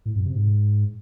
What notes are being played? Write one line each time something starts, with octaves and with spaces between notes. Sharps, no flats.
A2
F#2
C3
G#2